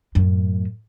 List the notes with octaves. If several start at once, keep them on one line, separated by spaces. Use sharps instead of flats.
F#2 A2